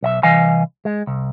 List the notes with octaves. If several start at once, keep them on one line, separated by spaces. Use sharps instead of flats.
B1 D#5 E5
C2 E3 D#5 F5 G#5
G#3
C2